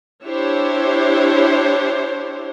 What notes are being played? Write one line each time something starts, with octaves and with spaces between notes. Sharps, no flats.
D4 E4 G4 C5 C#5